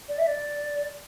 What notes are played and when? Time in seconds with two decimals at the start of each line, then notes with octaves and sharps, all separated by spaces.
0.08 D5
0.18 E5
0.27 D5